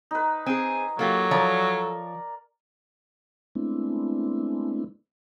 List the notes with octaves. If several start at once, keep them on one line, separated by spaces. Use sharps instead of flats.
D#4 B4
C4 G#4 G#5
F#3 A#3 F4 G4 A4
F3 A#4 C#5 D5
G#3 A3 B3 C4 D4 E4